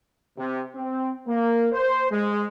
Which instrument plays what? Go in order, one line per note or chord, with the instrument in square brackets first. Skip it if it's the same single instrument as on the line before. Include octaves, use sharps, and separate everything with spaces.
[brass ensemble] C3
C4
A#3
C5
G#3